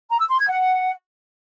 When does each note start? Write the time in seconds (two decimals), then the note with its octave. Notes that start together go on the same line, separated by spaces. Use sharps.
0.10 A#5
0.20 E6
0.29 C6
0.39 G#6
0.48 F#5